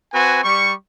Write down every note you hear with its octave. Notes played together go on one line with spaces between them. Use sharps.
C4 F#4 B4 G#5
G3 C#6